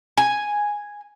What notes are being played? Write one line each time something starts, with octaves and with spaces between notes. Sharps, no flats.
G#5